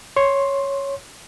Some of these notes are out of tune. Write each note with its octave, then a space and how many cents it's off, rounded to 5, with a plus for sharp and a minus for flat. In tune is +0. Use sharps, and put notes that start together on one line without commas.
C#5 +0 C6 +10